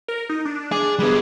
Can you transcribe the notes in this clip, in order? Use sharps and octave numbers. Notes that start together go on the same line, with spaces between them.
A#4
D#4
D4
G#4 D6
G3 B3 G#4